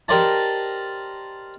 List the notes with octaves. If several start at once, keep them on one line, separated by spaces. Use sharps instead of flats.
G4 A#4 C5 D5 D#5 A5